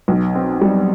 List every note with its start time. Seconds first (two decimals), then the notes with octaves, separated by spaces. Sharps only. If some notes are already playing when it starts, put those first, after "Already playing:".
0.08 B1
0.35 C4
0.61 G3